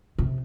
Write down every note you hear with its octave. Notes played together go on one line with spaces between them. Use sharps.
C3